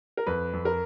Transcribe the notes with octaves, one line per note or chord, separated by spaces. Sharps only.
A#4
F2 B4
F2
A#4